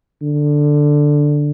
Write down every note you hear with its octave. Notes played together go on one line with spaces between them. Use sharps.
D3